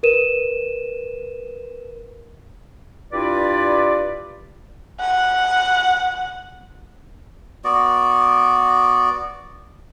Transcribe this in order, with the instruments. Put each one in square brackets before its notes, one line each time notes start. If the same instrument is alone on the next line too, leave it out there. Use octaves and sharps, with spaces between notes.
[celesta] A#4 B4 D#7 E7
[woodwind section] G2 E4 F4 B4 D5
[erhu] F#5
[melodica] B3 F#4 D5